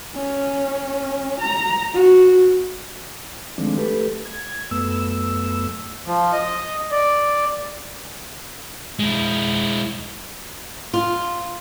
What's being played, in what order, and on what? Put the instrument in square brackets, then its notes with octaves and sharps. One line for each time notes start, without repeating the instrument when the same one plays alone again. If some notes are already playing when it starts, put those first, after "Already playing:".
[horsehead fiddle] C#4
A#5
F#4
[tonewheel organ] D#3 F3 G#3 A3 C4 D4
A3 G4 A4 B4
G#6
F#2 A3 B3 E6
[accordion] F3
D#5
D5
[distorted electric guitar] G#3 E4
[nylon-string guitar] F4